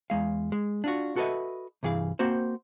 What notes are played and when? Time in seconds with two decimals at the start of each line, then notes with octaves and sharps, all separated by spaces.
0.10 E2 G#3 F5
0.52 G#3
0.84 D4 F4 F#4
1.16 F#4 A4 B4 C5 D#5 E5
1.83 C2 G2 E3 G#4 F5
2.19 A#3 C4 F#4 C5